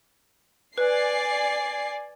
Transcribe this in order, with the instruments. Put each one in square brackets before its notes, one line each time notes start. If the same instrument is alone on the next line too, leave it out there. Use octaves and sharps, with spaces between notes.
[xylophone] B4 [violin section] D5 G#5 C7